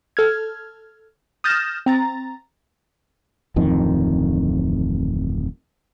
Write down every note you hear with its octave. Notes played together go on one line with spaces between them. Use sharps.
A4 F6 G#6
D#6 F6 G6 A6 A#6 E7
C4 A#5 A6
D1 F2 D#3